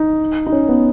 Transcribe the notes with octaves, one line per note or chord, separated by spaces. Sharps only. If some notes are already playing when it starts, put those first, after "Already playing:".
Already playing: D#4
D#4
C#4
B3